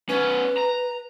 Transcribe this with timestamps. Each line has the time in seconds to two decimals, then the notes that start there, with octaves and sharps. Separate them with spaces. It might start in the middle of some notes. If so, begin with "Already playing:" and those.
0.09 B3 C#4 B4
0.57 A#5